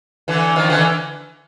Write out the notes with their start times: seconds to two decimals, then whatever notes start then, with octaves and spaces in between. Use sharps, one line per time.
0.28 D3 E3
0.56 D#3 F3
0.69 D3 E3